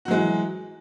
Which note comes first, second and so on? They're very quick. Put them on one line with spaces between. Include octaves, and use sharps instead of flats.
F#4 F#3 G#3 E3